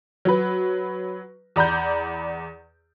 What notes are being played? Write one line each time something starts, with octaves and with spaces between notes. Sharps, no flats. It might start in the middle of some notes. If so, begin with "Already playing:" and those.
F#3 B4
E2 D5 A#5 B5 G6